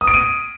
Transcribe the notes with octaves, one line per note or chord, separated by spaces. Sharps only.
D#6
D7
D#7